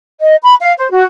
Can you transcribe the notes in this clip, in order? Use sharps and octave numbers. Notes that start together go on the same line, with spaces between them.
D#5
B5
F5
C5
F#4